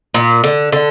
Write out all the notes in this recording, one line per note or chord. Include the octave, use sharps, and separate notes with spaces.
A#2
D3
D3